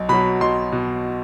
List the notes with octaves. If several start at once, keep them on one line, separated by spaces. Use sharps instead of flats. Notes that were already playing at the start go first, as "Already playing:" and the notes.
Already playing: B1
B2 F#3 B5
B1 C6
B2